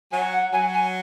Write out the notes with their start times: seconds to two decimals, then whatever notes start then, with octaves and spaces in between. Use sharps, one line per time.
0.11 F#3 G#5
0.32 F#5
0.52 F#3 G#5
0.73 G#5